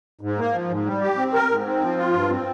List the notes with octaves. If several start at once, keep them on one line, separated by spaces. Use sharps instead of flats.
G#2
A#3
F3
G#2
G3
G4
C4
A#4
G#2
C4
F3
F4
G2
C4